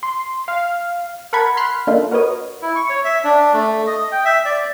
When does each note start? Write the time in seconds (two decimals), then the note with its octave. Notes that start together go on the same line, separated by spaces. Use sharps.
0.03 C6
0.48 F5
1.33 A#4 F#5 A5 B5 G#6
1.57 B5 C6 F6 F#6
1.87 A#3 D4 D#4 F4 A4 A#4
2.11 F#4 A#4 B4 C#5 D#5
2.62 E4
2.75 C#6
2.89 C#5
3.04 E5
3.24 D4
3.53 A3
3.87 D#5
4.12 G5
4.25 E5
4.45 D5